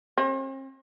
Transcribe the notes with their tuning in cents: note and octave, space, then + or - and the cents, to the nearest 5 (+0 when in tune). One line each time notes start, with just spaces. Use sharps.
C4 +45